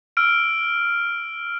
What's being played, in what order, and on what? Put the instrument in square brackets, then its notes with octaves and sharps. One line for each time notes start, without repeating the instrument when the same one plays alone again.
[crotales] E6 F6 D7